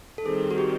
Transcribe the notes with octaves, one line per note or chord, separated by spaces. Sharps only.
A4
D#3 G3 C4 G#4
F#4
G4